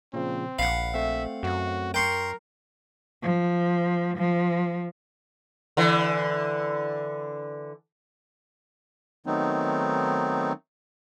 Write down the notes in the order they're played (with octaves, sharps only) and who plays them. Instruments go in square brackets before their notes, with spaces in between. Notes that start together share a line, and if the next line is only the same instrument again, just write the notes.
[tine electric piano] A#2 C#3 F3 [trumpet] C4
[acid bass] A#1 [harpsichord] F5 F#5 [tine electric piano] B5
[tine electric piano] A3 C4 [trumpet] E5
[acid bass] F#2 [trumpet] F#4
[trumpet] A#4 [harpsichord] G5 C6 C#6
[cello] F3
F3
[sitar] D3 E3
[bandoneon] D#3 F#3 A3 B3 C4 D#4